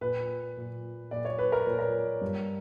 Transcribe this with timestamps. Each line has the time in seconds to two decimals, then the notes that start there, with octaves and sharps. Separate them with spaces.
0.01 A#2 B4
0.57 A#2
1.11 A#2 D5
1.25 C#5
1.38 B4
1.52 A#4
1.67 A#2
1.79 A#4
2.21 G2